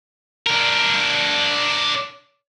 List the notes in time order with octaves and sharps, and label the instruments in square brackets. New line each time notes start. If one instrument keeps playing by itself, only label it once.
[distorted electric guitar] D4 A#4